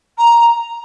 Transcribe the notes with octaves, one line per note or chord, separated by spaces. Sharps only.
A#5